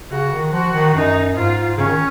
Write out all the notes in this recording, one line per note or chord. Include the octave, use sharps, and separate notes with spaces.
C#3 F#4
D#3
F3 F#4
D#3
F#2 D#4
G#2 F4
C#3 C#4
D#3